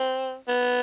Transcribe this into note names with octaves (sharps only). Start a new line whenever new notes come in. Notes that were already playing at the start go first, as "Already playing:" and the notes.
Already playing: C4
B3